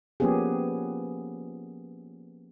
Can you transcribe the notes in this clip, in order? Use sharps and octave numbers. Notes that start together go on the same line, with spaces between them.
F3 A#3 B3 C#4 G4 G#4